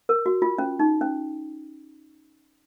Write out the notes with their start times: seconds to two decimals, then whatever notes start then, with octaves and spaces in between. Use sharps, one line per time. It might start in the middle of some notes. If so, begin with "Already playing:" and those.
0.09 A#4
0.26 F#4
0.42 F4
0.58 C#4
0.80 D#4
1.01 C#4